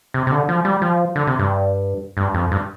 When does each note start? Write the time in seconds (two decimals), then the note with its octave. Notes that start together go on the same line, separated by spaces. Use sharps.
0.14 C3
0.27 C3
0.31 D3
0.49 F3
0.65 G3
0.82 F3
1.16 D3
1.27 C3
1.39 G2
2.17 G2
2.34 F2
2.51 G2